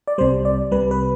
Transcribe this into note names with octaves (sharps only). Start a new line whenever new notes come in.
D5
C2 C3 G3 C5
D5
C2 C3 G3 B4
B4